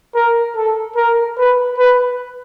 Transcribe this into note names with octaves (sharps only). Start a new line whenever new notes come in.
A#4
A4
A#4
B4
B4